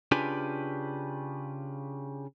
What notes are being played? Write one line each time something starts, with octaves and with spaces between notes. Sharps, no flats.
C#3 D4 F4 G4 B4 G#5